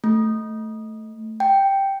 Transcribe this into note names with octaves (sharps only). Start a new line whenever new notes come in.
A3
G5